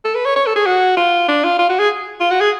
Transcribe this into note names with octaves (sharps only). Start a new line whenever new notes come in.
A4
B4
C#5
C#5
A4
G#4
F#4
F4
D4
F4
F4
F#4
G#4
F4
F#4
G#4